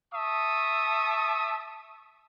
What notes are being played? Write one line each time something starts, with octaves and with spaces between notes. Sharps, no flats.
E5 A5 C#6 D#6